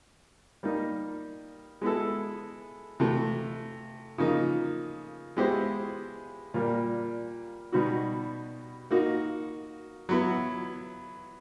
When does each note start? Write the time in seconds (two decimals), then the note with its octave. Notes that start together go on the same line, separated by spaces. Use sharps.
0.63 G3 A#3 D#4
1.81 G#3 B3 E4 A4
3.00 C3 E3 A3
4.18 C#3 F3 A#3 D#4
5.37 G#3 B3 E4 G4 C5
6.54 A#2 G3 A#3
7.72 B2 G3 B3 D#4 F#4
8.91 A#3 D#4 F#4
10.09 F#3 B3 E4